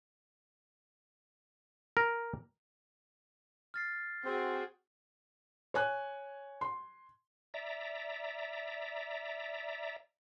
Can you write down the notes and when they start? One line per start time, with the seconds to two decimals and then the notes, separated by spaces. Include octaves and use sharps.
1.97 A#4
3.74 F6 A6 C7
4.25 C4 F#4 G#4 C5 G5
5.74 C#5 G#5 F#6
6.61 C6
7.54 D5 E5 A#5